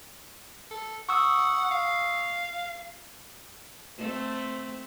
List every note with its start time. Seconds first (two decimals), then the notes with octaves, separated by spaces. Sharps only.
0.71 A4
1.09 F#5 C#6 D#6 E6
1.71 F5
3.98 A3 C4